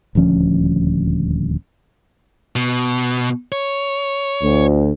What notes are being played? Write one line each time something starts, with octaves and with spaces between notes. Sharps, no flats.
D#1 D2 F3 C#4
B2
C#5
D2